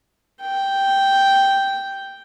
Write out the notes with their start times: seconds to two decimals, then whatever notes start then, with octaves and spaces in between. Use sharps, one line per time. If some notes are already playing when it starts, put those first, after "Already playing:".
0.41 G5